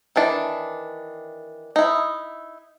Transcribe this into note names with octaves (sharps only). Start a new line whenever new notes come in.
D#3 E3 D4
D#4 E4